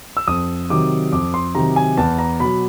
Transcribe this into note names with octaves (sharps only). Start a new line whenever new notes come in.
E6
F2 D#6
C3 D#3 F#3 D6
F2 D6
C6
C3 D#3 F#3 A#5
G#5
E2 A5
A#5
B2 F#3 B5